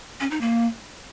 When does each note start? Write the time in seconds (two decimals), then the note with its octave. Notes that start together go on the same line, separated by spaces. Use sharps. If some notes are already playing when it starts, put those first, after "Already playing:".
0.20 C#4
0.31 D#4
0.41 A#3